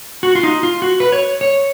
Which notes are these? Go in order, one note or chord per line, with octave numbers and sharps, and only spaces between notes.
F#4
F4
D#4
F4
F#4
B4
C#5
C#5